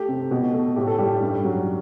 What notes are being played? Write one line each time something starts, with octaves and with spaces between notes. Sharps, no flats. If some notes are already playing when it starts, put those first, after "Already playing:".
Already playing: A3 G4
C3
B2
A3
A2 G4
A4
G3 G4
G2
F#3